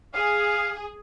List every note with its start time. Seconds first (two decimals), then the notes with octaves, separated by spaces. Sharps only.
0.14 G#4 F5